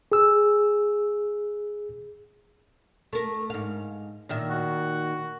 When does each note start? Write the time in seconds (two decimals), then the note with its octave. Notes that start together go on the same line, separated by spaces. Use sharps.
0.12 G#4 E6
3.13 A3 A#4
3.50 G#2 F5
4.29 A#2 D#3 E5
4.50 F#4